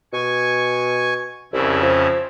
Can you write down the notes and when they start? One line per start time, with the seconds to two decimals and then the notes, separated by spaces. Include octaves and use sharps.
0.13 B2 G#5 C#6
1.53 C2 F2 C#3 E4
1.83 F3